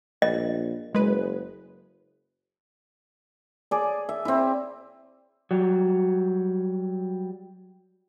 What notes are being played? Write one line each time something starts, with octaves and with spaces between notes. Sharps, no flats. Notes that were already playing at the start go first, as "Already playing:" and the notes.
A#1 D#5
F#1 G#3 B4
G#4 D5
E5
C4 E4
F#3 G3